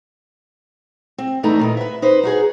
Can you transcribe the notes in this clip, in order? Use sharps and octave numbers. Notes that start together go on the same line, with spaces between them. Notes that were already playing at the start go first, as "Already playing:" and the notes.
C4
E2 G2 E3 A3 D#4 A#5
A#2 D#3 D#5
B4 E5
D#4 B4 C5
D#4 F#4 G#4